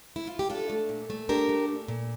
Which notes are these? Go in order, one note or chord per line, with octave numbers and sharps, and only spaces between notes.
E4
F4
G4
D4 F4 A4
A3
A#2
A3
D4 G4 A#4
A3
A#2
A#2